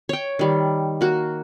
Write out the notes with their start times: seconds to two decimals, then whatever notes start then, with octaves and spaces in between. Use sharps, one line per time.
0.09 C#5 G5
0.39 D#3 G3
1.01 A#3 F#4